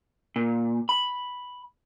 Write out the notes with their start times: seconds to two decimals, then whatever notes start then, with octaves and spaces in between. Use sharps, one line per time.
0.36 A#2
0.89 B5